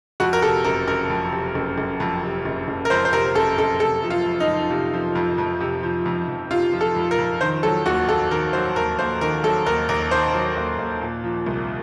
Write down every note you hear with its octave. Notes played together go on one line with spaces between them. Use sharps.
F2 F#4
A#4
C3 A4
F#1 A#4
F#1 A#4
F2
C3
F#1
F#1
F2
C3
F#1
F#1
A#4
F2 C5
C5
C3 A#4
F#1 A4
F#1 A4
C3 A4
F3
F4
F2
D#4
F2
C3
F3
F2
F2
C3
F3
F2
F2
C3 F4
F3
A4
F2
A#4
F2
D#3 C5
F#3 A4
D#2 F#4
D#2 A4
D#3 A#4
F#3 C5
D#2 A#4
D#2 C5
D#3 A#4
F#3 A4
D#2 A#4
D#2 A#4
D#3 C5
F#3
D#2
D#2
A#2
F3
C2